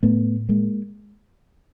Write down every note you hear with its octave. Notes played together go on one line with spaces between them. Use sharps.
A2 A3 B3
G#3 A#3